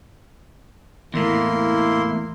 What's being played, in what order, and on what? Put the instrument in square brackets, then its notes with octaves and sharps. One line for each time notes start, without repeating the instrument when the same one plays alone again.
[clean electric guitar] E2 A2 [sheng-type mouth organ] A#3 E4 C6